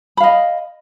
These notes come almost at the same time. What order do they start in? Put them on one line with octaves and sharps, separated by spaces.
B5 F5 D#5